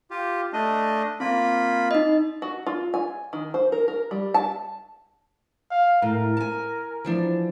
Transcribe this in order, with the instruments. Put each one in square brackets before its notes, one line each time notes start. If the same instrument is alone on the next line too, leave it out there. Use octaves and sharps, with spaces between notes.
[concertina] F4 G4
A3 D4 D#5
[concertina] A#3 F4 B5 [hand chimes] C4
[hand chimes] D#4 D#5
[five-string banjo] F#4
F4
G#5
D#3
C5
A#4
A#4
G3
A5
[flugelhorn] F5
[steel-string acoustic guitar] A2 [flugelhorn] A#4
[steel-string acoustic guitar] G#5 A5
E3 F3 D4